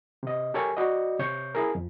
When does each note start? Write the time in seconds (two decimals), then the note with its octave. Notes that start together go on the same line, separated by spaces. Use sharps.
0.23 C3 D#5
0.54 G4 A4 A#4 C#5 G5 G#5
0.77 F#4 D5 D#5
1.19 C3 C#5 G6
1.55 E4 G#4 A#4
1.75 F2